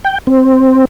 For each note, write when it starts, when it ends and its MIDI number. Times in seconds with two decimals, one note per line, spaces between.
0.04 0.18 79
0.27 0.85 60